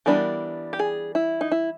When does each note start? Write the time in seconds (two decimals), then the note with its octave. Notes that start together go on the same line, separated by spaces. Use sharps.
0.06 E3 G3 B3 D4 A#4
0.73 G4
0.79 G#4
1.15 E4
1.41 D#4
1.52 E4